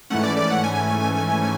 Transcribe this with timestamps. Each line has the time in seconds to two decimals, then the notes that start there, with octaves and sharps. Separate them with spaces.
0.10 G#2 E3 A3 C#4 F#5
0.23 D5
0.37 D5
0.50 F#5
0.63 G#5